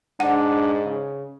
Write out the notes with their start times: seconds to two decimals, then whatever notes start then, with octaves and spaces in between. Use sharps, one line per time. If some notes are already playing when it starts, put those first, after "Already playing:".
0.20 G#2 D4 F#5
0.84 C#3